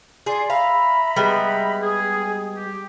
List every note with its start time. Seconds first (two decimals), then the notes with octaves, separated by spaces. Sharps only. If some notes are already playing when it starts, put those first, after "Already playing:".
0.26 G#4 D5 C6
0.50 E5 F5 A#5 B5
1.16 G3 G#3 B3
1.82 G#4
2.57 G4